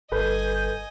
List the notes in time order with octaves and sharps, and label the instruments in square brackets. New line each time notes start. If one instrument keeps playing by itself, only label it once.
[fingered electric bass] G1 [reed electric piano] A4 B4 [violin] D#5 G#5 [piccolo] G6